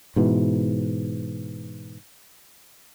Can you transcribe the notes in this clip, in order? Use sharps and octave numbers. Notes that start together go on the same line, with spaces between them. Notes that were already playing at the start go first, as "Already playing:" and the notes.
G#2 B2 E3